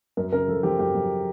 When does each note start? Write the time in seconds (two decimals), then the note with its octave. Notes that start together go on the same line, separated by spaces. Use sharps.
0.17 F#2 A#4
0.32 C#3 A#4
0.48 F3 A4
0.63 F3 G4
0.79 F#2 G4
0.95 F#2